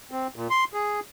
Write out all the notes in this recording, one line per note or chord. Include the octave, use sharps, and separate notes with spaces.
C4
A#2
C6
G#4